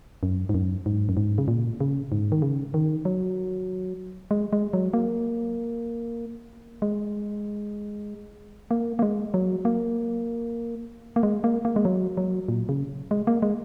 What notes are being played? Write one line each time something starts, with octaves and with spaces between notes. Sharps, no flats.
F#2
G#2
F#2
G#2
F#2
G#2
C#3
A#2
C#3
G#2
D#3
C#3
D#3
F#3
G#3
G#3
F#3
A#3
G#3
A#3
A#3
G#3
F#3
A#3
A#3
G#3
A#3
A#3
G#3
F#3
F#3
A#2
C#3
G#3
A#3
G#3